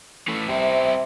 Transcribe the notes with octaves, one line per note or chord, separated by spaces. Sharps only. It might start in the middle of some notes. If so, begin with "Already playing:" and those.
E3 A3
C3 C4 E4